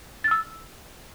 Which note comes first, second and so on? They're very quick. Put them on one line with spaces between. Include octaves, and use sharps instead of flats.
A6 F6 E6